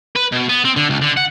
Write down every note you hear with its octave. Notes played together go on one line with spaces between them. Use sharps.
B4
B2
B3
C4
D3
C#2
D3
F#5